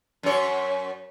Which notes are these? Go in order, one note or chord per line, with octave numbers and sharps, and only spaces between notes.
F#2 C#5